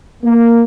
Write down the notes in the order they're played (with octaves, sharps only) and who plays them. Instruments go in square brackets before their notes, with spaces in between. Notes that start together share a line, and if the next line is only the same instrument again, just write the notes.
[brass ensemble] A#3